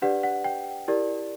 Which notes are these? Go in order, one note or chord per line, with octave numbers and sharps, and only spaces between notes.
D4 G4 B4 D5 F#5
F#5
G5
E4 G4 A#4 D5